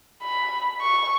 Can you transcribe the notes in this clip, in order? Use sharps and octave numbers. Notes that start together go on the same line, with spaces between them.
B5
C#6